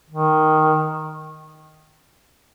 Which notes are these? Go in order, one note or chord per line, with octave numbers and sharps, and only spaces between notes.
D#3